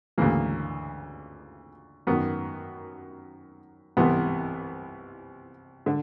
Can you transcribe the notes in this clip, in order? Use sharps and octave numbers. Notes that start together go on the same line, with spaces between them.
D2 C#3 E3 A#3
F#2 D#3 B3
C2 C3 E3 B3
D3